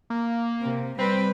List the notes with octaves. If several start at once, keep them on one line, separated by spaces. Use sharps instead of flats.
A#3
C3
G3 C4 B4